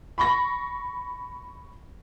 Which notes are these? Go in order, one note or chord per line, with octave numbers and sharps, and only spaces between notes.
B5 C#6 A#6